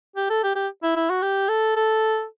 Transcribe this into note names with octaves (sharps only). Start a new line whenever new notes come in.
G4
A4
G4
G4
E4
E4
F#4
G4
A4
A4